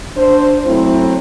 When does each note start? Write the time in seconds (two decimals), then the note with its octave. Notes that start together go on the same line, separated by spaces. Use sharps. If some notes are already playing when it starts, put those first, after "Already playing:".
0.17 D4 C5
0.66 F#3 A3 C4 E4